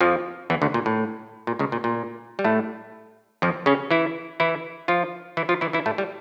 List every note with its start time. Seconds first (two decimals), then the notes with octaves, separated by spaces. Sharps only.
0.01 F2 F3
0.50 E2 E3
0.62 D2 D3
0.74 A#2
0.86 A2
1.47 A#2
1.59 C#2 C#3
1.72 A#2
1.84 A#2
2.39 G3
2.45 A2 A3
3.42 F2 F3
3.66 C#3 C#4
3.91 E3 E4
4.40 E3 E4
4.88 F3 F4
5.37 E3 E4
5.49 F3 F4
5.61 E3 E4
5.73 E3 E4
5.86 A2 A3
5.98 G3